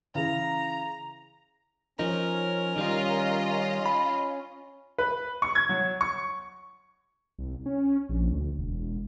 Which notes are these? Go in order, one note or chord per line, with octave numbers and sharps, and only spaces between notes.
C#3 E3 A#5
F3 C#4 D#4 A#4
D#3 G3 F4 D#5
B5
B4
C#6
G#6
F#3
C#6
C2
C#4
A#1
D2
E1